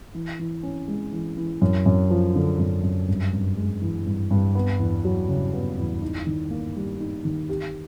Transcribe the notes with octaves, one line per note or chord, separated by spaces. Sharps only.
E3
E3
C#4
G#3
E3
E3
F#2
F#2
F3
D3
F#2
F#2
G2
G2
G#3
E3
G2
G2
B3
E2
F#3
C#3
B3
E2
D#4
D#3
A#3
G3
D#4
D#3
G4